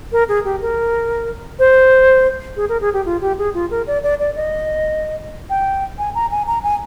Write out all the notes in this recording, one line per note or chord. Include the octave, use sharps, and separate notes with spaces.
A#4
G#4
G4
A#4
C5
G#4
A#4
G#4
G4
F4
G4
G#4
F4
A#4
D5
D5
D5
D#5
G5
G#5
A#5
G#5
A#5
G#5